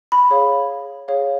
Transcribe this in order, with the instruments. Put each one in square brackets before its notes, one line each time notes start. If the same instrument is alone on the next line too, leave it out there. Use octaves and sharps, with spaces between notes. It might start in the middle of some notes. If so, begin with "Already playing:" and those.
[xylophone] B5
G#4 C#5 F5
G#4 C#5 F5